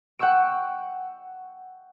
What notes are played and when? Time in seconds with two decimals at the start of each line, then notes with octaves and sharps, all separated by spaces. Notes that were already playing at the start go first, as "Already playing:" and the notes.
0.19 F#5 G5 C#6 E6 D7